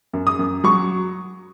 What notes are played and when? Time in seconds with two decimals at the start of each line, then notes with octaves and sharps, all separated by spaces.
0.13 F#2
0.27 D#6
0.39 F#2
0.64 F#3 C#6